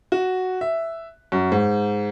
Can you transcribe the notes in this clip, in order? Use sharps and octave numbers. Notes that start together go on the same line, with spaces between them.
F#4
E5
F#2
G#2